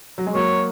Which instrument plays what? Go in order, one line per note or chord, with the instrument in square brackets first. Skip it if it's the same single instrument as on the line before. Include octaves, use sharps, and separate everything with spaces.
[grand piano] F#3
G#3
[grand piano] F#3 A#3 [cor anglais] C#5